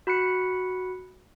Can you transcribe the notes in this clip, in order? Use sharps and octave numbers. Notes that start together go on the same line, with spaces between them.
F#4 B5 F#6 C#7